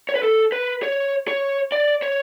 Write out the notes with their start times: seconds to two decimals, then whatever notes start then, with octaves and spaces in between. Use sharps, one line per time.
0.09 C#5
0.16 B4
0.23 A4
0.52 B4
0.83 C#5
1.28 C#5
1.72 D5
2.02 C#5